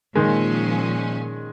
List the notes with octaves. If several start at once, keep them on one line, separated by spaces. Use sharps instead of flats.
A#2 D#3 F3 G#3 C#4